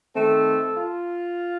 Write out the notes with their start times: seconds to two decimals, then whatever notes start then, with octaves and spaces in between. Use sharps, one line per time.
0.15 D#3 A3 C4 A4
0.77 F4